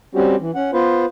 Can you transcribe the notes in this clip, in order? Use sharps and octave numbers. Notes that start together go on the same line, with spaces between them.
G3 C4 C#4 F#4 G4
E3
C#4 F#5
B3 F4 B4 C5